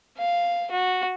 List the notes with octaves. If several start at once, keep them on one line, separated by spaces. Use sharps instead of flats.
F5
F#4